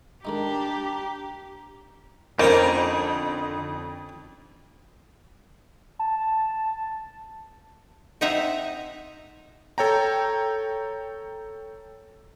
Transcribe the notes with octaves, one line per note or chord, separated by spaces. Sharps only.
D#3 G#3 D4 D#4 G4 A#5
F2 D3 A#3 C#4 D#4 C5 A#5 D7
A5
C4 D#4 D#5 E5 F#5 A#5
A4 C#5 G5 A#5